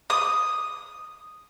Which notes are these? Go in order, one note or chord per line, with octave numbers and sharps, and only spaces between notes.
D#6